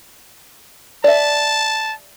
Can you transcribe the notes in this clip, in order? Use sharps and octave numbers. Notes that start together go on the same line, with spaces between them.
D5 E5 A5